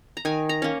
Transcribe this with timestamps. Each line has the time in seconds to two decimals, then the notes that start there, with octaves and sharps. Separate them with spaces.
0.17 A#5
0.25 D#3 G#5
0.49 A#5
0.62 A#3 C#4